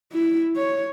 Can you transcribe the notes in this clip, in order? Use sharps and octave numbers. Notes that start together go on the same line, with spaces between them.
E4
C#5